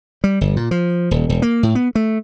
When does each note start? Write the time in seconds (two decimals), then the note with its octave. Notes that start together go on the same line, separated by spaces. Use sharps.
0.24 G3
0.41 G1
0.57 A#2
0.71 F3
1.11 D#1
1.29 E1
1.42 A#3
1.63 A2
1.75 B3
1.95 A3